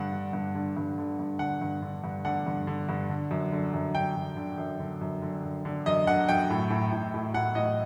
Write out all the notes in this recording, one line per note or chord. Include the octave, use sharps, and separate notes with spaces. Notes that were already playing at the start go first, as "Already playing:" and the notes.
Already playing: G2 D3 F#5
D3
G2
D3
G2
D3
G2
D3 F#5
G2
D3
G2
D3 F#5
G2
D3
G2
D3
F#2
D3
F#2
D3 G5
F#2
D3
F#2
D3
F#2
D3
F#2
D3
F#2 D#5
D3 F#5
F#2 G5
A2
A2
A2
A2
A2 F#5
A2 D#5